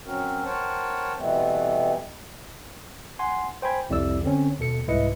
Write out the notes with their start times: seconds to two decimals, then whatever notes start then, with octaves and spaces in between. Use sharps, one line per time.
0.06 F#3 C4 C#4 F#4 A#4
0.44 A#4 C5 C#5 F#5 G5 A5
1.17 B2 E3 G3 A3 B3 C4
3.19 F#5 G#5 C6
3.62 C5 G5 G#5 B5 G#6
3.89 C2 F2 G3 E4 D5 E6
4.23 D3 C4 C#4
4.59 D#2 B2 A4 C#7
4.88 C2 G#2 E4 B4 D#5 C#7